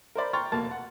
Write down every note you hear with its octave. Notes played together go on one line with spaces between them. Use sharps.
A#4 C5 D5 B5
G5 A#5 C6 C#6 F6 A6
F1 D#2 B2 A#3 A5 A6
F#5